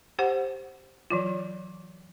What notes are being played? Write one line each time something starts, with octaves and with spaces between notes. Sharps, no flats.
G4 C5 F#5
E3 F#3 F4